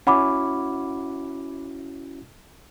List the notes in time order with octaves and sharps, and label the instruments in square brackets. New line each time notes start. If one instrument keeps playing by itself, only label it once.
[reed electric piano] C#4 E4 F#4 [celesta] F#5 B5 D6